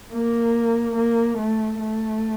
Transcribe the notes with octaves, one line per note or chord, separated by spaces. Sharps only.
A#3
A#3
A3
A3